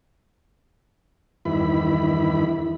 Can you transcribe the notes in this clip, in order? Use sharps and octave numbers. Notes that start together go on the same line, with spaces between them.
E2 G2 D#3 E4 B5